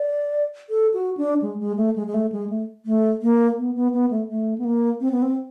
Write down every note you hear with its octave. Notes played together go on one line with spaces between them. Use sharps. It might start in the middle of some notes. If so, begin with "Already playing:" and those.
Already playing: D5
A4
F#4
D4
G#3
G#3
A3
G#3
G#3
A3
G#3
A3
A3
A#3
B3
B3
B3
A3
A3
B3
A#3
C4
B3
C4